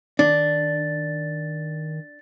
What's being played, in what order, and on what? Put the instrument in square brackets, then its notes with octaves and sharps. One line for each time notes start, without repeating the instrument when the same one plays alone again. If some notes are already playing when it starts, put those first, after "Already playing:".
[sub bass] D#3 [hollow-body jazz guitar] D4 [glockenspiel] A6